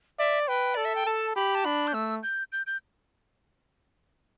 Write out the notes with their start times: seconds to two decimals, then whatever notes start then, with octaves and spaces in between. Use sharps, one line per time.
0.19 D5 E5
0.48 B4 G5
0.75 A4 D5
0.85 E5
0.96 G5
1.06 A4 A5
1.36 G4 B5
1.55 A5
1.65 D4 B5
1.87 G6
1.94 A3 E6
2.23 G6
2.52 G6
2.67 G6